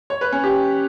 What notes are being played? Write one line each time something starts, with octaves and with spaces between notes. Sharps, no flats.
C#5
B4
C#4
G4